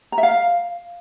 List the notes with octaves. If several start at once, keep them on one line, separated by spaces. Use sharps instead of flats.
A#5
E5
F5